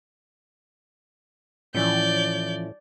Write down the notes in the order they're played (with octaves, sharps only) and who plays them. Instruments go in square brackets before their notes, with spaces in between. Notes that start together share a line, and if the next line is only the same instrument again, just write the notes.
[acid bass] A2 [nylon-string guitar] E3 F3 C#4 [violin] D5 G6